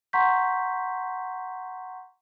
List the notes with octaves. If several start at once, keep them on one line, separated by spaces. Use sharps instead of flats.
F#5 A#5 C6 C#6 G6 B6